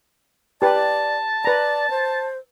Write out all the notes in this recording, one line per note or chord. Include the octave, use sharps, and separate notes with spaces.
G4 B4 D5 A5
B4 D5 A#5
C5